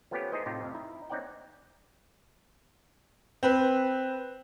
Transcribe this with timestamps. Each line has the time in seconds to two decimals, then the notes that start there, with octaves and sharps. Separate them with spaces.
0.11 F3 A3 B3 C#4 G4 B4
0.32 D#4 E4 G#4 C5 D#5
0.46 A2 C3 D#4 F4 G4
0.61 F2 C3 F5
0.75 D#4 E4
1.10 C4 C#4 D#4 D5 F#5 G5
3.43 C4 B4